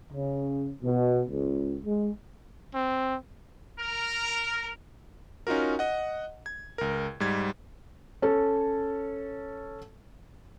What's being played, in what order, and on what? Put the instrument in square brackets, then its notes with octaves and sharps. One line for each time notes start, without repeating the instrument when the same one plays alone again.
[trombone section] C#3
B2
C#2
G#3
[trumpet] C4
[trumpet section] A#4
[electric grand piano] C#4 D#4 F4 F#4 A#4
D#5 F#5
G#6
C#2 A#4
G#2 G3 G#6
[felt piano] C#4 A4